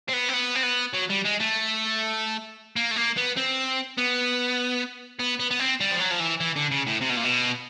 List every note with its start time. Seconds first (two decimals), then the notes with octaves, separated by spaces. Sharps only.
0.08 C4
0.13 B3
0.29 C4
0.33 B3
0.55 C4
0.63 B3
0.93 F#3
1.10 G3
1.25 G#3
1.40 A3
2.76 A#3
2.91 A3
2.97 A#3
3.17 B3
3.37 C4
3.98 B3
5.19 B3
5.39 B3
5.51 B3
5.59 C4
5.81 G3
5.91 F3
6.00 F#3
6.11 F3
6.20 E3
6.40 E3
6.56 D3
6.71 C#3
6.86 A2
7.01 C3
7.09 B2
7.17 A#2
7.24 B2